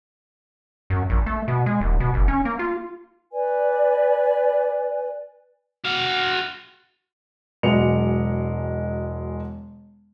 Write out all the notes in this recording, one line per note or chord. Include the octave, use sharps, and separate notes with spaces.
F#2
A#1
A3
B2
G#3
D#1
B2
F#1
C#4
A#3
F4
B4 D5 G#5
F#4 F5
E1 F#3 G#3 D#5 C#7 F7